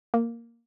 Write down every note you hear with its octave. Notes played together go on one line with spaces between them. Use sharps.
A#3